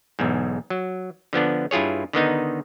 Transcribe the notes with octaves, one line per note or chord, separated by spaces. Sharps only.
B1 E2 G#2
F#3
D3 F3 B3 D4
G2 E4 F4 G#4 C#5
D3 D#3 B3 D#4